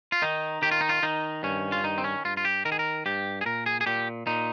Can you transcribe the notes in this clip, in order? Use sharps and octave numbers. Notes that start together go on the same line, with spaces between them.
F4
D#3 D#4
D#3 G4
F4
D#4
F4
D#3 D#4
G2 C#4
F4
D#3 D#4
C4
C#4
G2 F4
F4
G4
D#3 A#4
G#4
A#4
G2 G4
G#4
A#2 A#4
G#4
G#4
A#2 G4
A#2 D#4